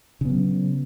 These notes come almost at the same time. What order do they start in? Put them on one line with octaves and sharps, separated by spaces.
C#3 B3 F#3